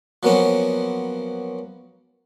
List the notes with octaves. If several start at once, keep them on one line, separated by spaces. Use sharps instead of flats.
F3 F#3 A#3 B3 C#4